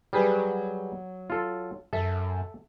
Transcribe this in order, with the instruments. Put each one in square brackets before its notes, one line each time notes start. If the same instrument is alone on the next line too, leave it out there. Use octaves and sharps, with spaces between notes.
[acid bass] F#3 [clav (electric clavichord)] G3 G#4 B4
[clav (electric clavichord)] F4 A4
[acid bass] F#2 [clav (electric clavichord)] A4 E5